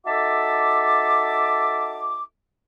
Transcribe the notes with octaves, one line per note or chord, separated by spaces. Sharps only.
D#4 F#4 A4 E5 A5 D6